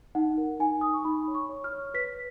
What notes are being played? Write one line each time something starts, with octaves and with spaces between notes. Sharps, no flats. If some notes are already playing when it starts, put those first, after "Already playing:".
D#4 F#5
A#4
D#4 G#5
D#4 D#6
C#6
D#4 B5
C#5
C#6
C#5
F6
C#5
B4 B6